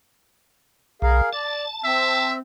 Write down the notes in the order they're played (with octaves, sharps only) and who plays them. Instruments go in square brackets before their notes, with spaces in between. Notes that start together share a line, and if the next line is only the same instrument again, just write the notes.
[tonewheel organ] B1 [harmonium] G#4 A#4 F5
[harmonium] D5 [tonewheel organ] A5
[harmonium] C4 [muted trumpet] E5